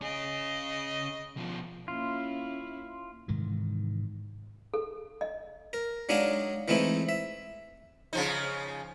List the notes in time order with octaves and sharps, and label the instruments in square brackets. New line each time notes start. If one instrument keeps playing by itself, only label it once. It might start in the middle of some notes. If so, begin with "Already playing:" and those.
[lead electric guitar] C#4 G#4 [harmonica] D#5
[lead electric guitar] B2 F3
[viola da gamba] A#3 C#4 E4 [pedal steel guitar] F4
[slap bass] G#2 C3 D#3 E3
[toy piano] A4
D#5
[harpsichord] A#4
F#3 G#3 D4 D#4 G#4 F5
E3 G#3 A3 C4 D#4 E4
E5
[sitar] C#3 F3 D#4